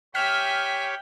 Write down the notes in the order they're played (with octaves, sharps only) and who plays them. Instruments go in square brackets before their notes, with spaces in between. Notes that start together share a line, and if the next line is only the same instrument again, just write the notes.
[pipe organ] G4 C#5 B5 [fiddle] E5 G#5 [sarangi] G5 [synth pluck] F6 B6